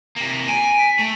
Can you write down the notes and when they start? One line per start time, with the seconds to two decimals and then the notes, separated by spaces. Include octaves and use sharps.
0.16 C3 A#3
0.48 G#5 D7
0.79 B6
0.99 A3